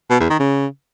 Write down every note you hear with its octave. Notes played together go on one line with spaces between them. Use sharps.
B2
E2
D#3
C#3